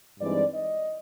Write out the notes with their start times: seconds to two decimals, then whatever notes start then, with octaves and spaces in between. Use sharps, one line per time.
0.20 G2 E3 G#3 C4 D#4 D5
0.53 D#5